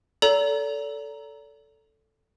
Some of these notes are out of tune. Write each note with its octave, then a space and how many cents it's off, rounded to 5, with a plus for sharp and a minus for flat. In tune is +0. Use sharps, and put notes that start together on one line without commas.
A4 +0 D5 -45 A#5 +0